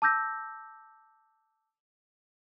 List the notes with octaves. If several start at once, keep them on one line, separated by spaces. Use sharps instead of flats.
A5 D6 E6 G6 A#6